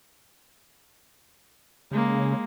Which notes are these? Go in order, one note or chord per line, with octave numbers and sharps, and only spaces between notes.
C#3 G#3 A#3